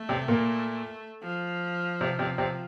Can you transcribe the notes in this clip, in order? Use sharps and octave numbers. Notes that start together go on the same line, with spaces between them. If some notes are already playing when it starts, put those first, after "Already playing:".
Already playing: A3
C3 C4
A#2 A#3
F3
C3 C4
C3 C4
C3 C4